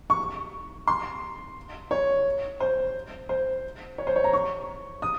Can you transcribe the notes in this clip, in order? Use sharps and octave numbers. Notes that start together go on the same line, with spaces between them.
C#6
C6
C#5
C5
C5
C#5
C5
C#5
A#5
C#6
D#6